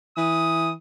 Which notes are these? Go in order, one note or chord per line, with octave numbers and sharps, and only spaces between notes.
E3 D#6